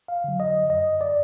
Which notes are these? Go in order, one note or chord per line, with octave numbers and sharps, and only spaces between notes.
F5
D3 F#3
D#5
F#2 D#5
D5